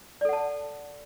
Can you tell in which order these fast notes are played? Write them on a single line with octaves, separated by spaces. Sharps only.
D5 A4 F#5 A5